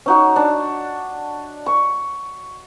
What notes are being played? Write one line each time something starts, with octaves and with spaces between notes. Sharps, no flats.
C#4 D#4 F#4
D4
C#6